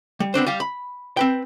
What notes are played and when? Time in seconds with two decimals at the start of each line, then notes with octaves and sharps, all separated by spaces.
0.20 G3
0.34 B3 C4 D4 C5
0.47 G3 G4 F5
0.60 B5
1.17 C4 B4 G5